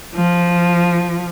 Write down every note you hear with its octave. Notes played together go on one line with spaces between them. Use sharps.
F3